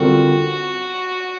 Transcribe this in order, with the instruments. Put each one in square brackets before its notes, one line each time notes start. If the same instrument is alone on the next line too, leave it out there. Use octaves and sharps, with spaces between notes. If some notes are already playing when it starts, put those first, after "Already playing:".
Already playing: [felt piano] D3 G3 C4 F4 A#4 [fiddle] F#4